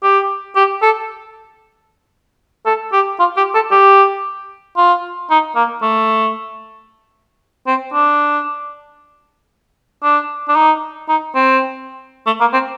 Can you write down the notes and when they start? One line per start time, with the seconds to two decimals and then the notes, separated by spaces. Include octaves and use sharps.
0.03 G4
0.56 G4
0.82 A4
2.66 A4
2.93 G4
3.19 F4
3.37 G4
3.55 A4
3.71 G4
4.77 F4
5.30 D#4
5.55 A#3
5.82 A3
7.67 C4
7.93 D4
10.03 D4
10.48 D4
10.56 D#4
11.09 D#4
11.35 C4
12.26 A3
12.40 A#3
12.53 C4